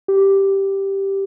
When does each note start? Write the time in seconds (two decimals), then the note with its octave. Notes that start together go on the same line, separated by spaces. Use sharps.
0.08 G4